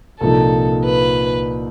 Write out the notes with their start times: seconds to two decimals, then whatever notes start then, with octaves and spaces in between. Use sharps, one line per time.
0.21 C2 A#2 F3 A#3 D#4 A4
0.86 B4